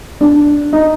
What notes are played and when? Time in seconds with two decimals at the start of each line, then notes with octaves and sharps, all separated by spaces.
0.21 D4
0.73 D#4